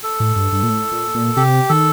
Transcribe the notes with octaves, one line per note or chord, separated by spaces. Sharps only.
A4
A2
G2
G2
A#2
A2
A#2
A#2
C3 G4
D#3 A4